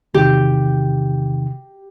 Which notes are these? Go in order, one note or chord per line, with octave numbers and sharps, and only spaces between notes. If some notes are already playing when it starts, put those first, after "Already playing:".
E2 C3 D#3 G4